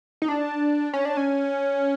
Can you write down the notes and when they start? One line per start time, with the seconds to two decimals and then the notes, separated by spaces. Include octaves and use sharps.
0.22 D#4
0.28 D4
0.93 C#4
1.05 D4
1.17 C#4